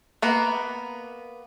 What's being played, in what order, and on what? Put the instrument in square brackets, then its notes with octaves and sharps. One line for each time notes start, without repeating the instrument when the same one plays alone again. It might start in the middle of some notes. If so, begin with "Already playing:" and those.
[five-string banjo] A#3 B3 A#4